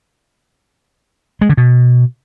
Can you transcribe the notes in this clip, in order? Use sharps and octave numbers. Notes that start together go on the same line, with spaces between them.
G#3
D3
B2